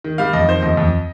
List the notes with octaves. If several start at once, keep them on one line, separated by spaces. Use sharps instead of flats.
D#3
G3 F5
F2 D#5
D#3 C5
F2 D#5
F2